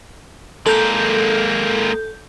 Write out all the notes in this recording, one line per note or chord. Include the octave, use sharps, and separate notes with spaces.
G#3 A#3 A4 G6